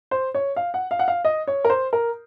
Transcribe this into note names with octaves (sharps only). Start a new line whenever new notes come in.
C5
C#5
F5
F#5
F5
F#5
F5
D#5
C#5
A#4
C5
A#4